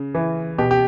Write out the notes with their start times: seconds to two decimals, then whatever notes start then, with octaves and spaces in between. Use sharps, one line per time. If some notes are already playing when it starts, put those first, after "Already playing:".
Already playing: C#3
0.15 E3
0.58 B2 G4
0.71 G4